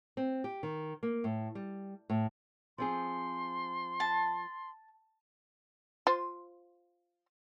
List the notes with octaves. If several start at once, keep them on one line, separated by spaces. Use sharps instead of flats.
C4
G4
D#3
A#3
A2
G3
A2
F3 C4 G#4 C6
A5
F4 C5